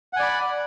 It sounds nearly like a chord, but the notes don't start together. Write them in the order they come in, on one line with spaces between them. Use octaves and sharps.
F#5 G#5 D5 B5